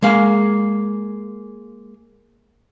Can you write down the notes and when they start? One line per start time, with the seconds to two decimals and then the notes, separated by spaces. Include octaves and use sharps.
0.02 G#3 A#3 F5